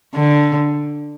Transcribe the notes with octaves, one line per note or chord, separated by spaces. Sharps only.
D3